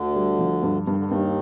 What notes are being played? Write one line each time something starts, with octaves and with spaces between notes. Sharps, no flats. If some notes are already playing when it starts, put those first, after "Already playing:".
Already playing: D2 D3
G3
F3
G2
G2 D#3
D3
D#2 D#3
G2